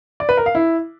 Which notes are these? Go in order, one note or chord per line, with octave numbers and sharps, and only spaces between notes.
D5
B4
A#4
F5
E4